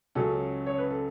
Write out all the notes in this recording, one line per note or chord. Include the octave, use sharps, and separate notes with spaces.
C#2 C#3 F#3 C#4 A4
C#5
B4
A4